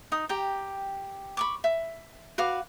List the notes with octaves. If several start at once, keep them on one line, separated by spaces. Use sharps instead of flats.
D#4 D#6
G4 G5 A#5
B5 C#6 D6
E5
F#4 B4 F5 D6